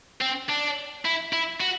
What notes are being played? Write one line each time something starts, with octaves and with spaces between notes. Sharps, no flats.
C4
D4
E4
E4
F#4